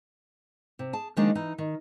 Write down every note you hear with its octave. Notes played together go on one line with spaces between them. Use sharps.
C3
G#4 A5
D#3 F3 G#3 A#3 D4 D#4
E3 D#4
D#3